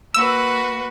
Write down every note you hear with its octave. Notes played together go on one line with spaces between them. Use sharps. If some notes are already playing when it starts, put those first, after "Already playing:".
A#3 F#4 B4 E6